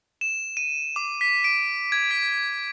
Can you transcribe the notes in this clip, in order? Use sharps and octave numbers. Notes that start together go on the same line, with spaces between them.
E7
D#7
D6
B6
D7
G#6
B6